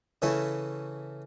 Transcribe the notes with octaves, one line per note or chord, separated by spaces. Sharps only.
C#3 E3 A3 C#4 E4